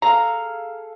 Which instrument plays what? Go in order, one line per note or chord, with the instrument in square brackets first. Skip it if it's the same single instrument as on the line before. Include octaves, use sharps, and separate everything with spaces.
[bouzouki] G#4 A4 F5 [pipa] A#5